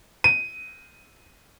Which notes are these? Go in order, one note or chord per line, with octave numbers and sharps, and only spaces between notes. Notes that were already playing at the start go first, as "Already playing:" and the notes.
D#7